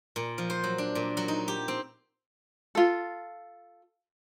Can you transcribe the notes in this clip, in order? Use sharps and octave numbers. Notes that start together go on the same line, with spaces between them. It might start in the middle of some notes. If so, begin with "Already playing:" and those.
A#2
F3
C5
F#3
D4
A#2
F#3
D#4
G4
C4
F4 A4